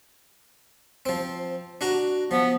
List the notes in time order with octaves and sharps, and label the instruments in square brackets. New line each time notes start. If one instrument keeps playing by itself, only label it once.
[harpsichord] F3 C4
D4 F#4 A#5
[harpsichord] F3 [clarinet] B3